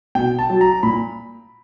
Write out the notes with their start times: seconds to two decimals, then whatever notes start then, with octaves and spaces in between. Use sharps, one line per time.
0.15 B2 G5
0.39 A5
0.50 F#3
0.61 A#5
0.83 A#2 B5